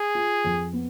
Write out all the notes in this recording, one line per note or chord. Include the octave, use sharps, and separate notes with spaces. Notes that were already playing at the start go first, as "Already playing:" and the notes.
Already playing: G#4
F4
F2
B3